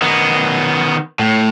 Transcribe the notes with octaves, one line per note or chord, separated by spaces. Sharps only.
D#3 B3
A2